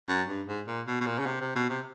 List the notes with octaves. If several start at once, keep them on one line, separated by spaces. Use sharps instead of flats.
F#2
G2
G#2
A#2
B2
B2
A#2
C#3
C3
C3
B2
C3